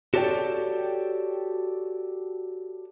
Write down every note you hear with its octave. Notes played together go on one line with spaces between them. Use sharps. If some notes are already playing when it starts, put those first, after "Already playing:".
F#4 G4 A4 C#5 D5 G5